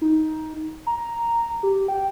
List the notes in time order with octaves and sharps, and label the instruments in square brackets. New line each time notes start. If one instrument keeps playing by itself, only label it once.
[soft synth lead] D#4
A#5
G4
G5